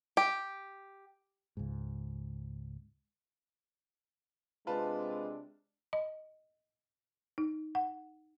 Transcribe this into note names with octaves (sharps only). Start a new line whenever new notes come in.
G4
C#2 G#2
C3 G#3 C4 D4 F4 B4 A5
D#5
D#4
F#5